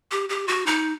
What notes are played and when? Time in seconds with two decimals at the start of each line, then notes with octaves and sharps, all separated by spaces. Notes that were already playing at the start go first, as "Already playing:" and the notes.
0.11 G4
0.29 G4
0.48 F#4
0.66 D#4